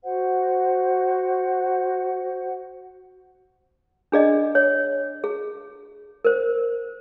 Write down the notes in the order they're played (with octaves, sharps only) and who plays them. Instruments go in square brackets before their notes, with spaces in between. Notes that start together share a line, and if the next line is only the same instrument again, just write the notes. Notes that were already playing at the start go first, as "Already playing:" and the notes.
[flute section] F#4 C5 F#5
[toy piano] D4 G#4 D5 D#5
C#5
G#4
A#4 C5